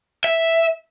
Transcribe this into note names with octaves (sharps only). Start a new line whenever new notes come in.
E5